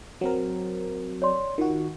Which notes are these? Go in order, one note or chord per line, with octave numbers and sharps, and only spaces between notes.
F#3 C4 A#4
C#5 D5 C6
D#3 F4 F#4